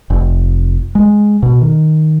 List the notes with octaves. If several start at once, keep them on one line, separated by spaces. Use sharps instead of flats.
F1
G#3
B2
D#3